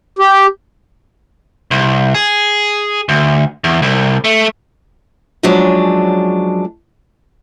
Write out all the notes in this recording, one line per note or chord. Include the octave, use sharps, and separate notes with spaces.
G4
C2
G#4
D2
E2
C2
A3
F#2 F3 F#3 G#3 D4